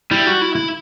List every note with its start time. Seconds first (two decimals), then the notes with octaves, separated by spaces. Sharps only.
0.11 G3 E4
0.27 F#4
0.42 E4
0.55 E4